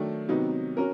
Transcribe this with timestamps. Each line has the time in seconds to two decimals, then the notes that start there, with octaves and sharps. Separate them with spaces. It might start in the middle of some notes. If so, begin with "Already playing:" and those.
Already playing: D#3 F#3 A3 D4
0.28 C3 D#3 F#3 B3 D#4
0.77 C#4 F#4 A#4